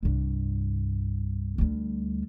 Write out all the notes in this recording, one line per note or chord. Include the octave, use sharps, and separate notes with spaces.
C2 G2
D2 G3